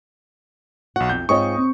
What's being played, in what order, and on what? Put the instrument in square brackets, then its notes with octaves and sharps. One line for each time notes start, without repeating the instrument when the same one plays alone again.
[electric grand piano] B1 F#5 [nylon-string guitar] F#4
[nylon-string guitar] F2 [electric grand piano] G6
[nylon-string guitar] G#2 C4 F4 [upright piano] C#5 D#5 D#6 [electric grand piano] C#6
[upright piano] C4